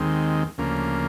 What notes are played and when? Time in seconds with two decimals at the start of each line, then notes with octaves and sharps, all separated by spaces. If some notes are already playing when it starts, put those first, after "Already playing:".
Already playing: D#2 D#3 G#3 C4
0.58 D2 C#3 F3 A#3